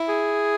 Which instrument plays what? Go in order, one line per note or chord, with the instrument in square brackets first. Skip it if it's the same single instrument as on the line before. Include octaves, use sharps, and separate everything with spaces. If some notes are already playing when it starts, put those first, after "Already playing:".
Already playing: [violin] E4
[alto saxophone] G#4